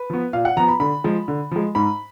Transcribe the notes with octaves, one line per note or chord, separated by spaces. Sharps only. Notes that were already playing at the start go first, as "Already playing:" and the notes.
Already playing: B4
F3 B3
A#2 F5
F#5
F3 B3 A#5
B5
D3 B5
F3 G#3
D3
F3 G#3
G#2 B5